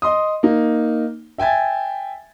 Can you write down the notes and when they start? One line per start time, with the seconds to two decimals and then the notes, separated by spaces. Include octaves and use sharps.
0.02 D#5 C6 D#6
0.43 A#3 D#4
1.38 E5 G5 G#5 G#6 A6